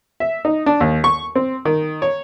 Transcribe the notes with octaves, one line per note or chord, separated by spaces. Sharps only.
E5
D#4
D4
D#2
C#6
C4
D#3
C#5